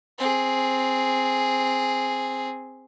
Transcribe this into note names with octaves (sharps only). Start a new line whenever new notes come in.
C4 G#4